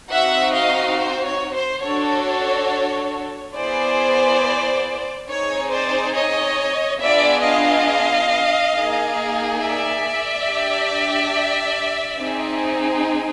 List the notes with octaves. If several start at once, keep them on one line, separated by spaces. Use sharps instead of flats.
C4 D#4 F#4 E5 F#5
D#5 F5
C5
C#5
C5
D4 F#4 A4 C#5
B3 E4 G#4 C5 D5
C4 D#4 G#4 C#5
C5 D5
C#5 D#5
B3 D4 F4 G#4 D5 E5
D#5 F5
A#3 D#4 G#4
D5 E5
D4 G4
C4 D#4 G#4